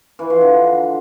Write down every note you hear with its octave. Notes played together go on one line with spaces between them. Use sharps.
E3
F3
D3